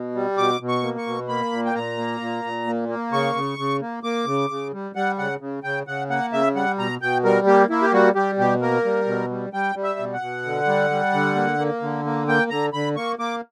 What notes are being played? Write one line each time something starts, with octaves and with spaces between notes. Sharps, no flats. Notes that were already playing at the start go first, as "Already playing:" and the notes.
Already playing: B2
G3
B2 D6
B2
C#6
A#3
C#6
B2
A#3 B5
A#2
G5
A#2 A#5
A#3
A#2
A#2
A#3
A#3
C#3 C#6
C#3
C#3
A#3
A#3 D6
C#3
C#3
G3
G3 F#5
C#3 F#5
C#3
C#3 G5
C#3 F#5
A#3 F#5
C#3 E5
G3 F#5
B2 A#5
B2 G5
G3 A#4
A#3 G4
A#3 E4
G4
G3 F#4
G3 G4
B2 G4
A#3 A#4
G3
B2
G3
G3 G5
G3
E5
B2
F#5
B2
D3
G3
G3
D3
A#3
A#3
D3
A#3
A#3 G5
D3 A#5
D3 B5
A#3 C#6
A#3 D6